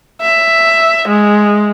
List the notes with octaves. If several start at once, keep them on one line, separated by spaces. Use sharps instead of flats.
E5
G#3